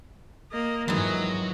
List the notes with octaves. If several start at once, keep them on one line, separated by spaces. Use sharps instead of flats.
A#3 D#5
F2 G#2 D#3 E3 F#3 G#3 D#5